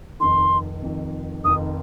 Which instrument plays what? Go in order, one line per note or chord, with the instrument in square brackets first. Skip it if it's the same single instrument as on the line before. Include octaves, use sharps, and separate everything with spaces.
[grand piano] F1 F2 D#3 [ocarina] C6
[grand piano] F1 F2 D#3
[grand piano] F1 F2 D#3 [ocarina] D#6